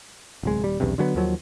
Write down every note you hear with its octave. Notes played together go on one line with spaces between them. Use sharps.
D1 C2 G#3
D#1 G3
B1 E2 G2 C3
D3 F#3 G#3 B3
D#2 D#3 F3 F#3